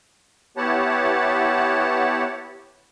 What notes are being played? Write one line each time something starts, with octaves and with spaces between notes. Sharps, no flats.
B3 E4 G4 C#5 F#5 A5